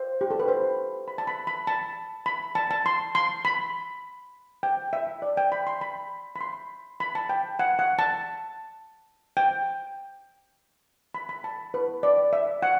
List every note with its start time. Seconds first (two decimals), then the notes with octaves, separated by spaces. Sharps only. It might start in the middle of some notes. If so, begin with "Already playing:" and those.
Already playing: C5
0.21 G4
0.31 A4
0.40 B4
0.48 C5
1.08 B5
1.18 A5
1.27 B5
1.47 B5
1.67 A5
2.26 B5
2.55 A5
2.71 A5
2.86 C6
3.15 C6
3.45 B5
4.63 G5
4.93 E5
5.22 D5
5.37 G5
5.52 B5
5.67 C6
5.81 B5
6.36 B5
6.41 C6
7.00 B5
7.15 A5
7.29 G5
7.59 F#5
7.79 F#5
7.99 A5
9.37 G5
11.15 B5
11.29 B5
11.44 A5
11.74 B4
12.03 D5
12.33 E5
12.62 F#5